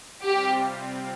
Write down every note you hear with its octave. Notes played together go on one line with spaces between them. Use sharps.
C3 G3 C4 F4 G4